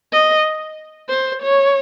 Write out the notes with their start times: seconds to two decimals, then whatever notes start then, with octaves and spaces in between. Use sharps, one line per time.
0.12 D#5
1.09 C5
1.42 C#5